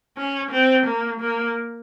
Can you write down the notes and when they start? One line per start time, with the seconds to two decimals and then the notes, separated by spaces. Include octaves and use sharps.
0.18 C#4
0.51 C4
0.86 A#3
1.20 A#3